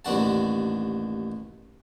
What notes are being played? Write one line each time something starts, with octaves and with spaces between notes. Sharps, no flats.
A1 D#2 D4 F#4 A5